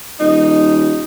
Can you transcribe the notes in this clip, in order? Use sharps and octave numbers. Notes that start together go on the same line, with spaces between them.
D#1 D#4